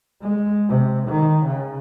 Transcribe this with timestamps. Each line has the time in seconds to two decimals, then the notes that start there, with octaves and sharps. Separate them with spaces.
0.22 G#3
0.69 C3
1.08 D#3
1.46 C#3